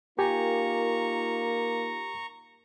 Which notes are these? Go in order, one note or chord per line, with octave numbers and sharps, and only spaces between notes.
A#3 D#4 F4 G4 A#4 G#5 A#5 C#6